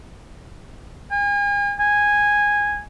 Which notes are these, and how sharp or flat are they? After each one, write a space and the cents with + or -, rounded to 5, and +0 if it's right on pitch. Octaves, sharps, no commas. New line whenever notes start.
G#5 -40
G#5 -10